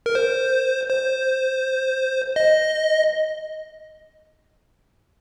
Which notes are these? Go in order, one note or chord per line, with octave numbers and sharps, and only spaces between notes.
A#4
C5
C5
D#5